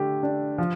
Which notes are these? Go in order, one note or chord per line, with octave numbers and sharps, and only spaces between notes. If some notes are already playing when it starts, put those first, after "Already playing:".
Already playing: D3 A3 G4
D4
F3